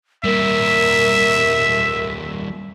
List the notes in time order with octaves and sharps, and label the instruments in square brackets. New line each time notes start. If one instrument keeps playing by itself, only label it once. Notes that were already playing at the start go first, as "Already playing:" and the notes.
[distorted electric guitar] G3 A#3 [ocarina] A#4 [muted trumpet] E5